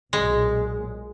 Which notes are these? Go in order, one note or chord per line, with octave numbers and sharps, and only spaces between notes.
B1 A#2 G#3